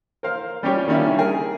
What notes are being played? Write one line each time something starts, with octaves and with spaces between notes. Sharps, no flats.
A#4 C5 F5
G3 C#4 F4 G4 C#5
D#3 G3 A#3 C#4 D4 E4
G#4 A#4